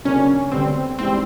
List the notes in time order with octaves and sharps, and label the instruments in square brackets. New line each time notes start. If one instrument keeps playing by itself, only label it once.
[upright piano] C#3 F#3 A#3 D4 [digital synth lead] C#4
[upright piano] D2 D3 G3 B3 [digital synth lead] C4
[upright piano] G#2 E3 G3 [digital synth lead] C4